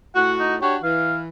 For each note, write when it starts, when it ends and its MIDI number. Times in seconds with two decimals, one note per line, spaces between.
0.16 0.56 45
0.16 0.56 66
0.16 0.33 78
0.39 0.55 63
0.62 0.78 62
0.62 0.78 66
0.62 0.78 67
0.62 0.75 73
0.83 1.29 52
0.83 1.19 77